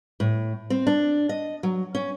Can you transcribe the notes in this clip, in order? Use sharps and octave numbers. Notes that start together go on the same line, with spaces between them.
A2
C4
D4
D#5
F#3
C#4